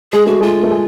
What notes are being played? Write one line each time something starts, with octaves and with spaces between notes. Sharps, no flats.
G#3 G#4
A3 F#4
G#3 F4
A3
G#3